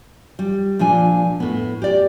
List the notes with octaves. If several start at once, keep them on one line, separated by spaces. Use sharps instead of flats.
G3
A#2 F3 D4 G#5
A2 B3
G4 D5